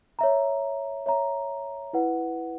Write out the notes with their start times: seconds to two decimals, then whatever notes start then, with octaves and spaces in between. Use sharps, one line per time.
0.19 C#5 E5 A#5
1.06 C#5 E5 A#5
1.93 E4 B4 F#5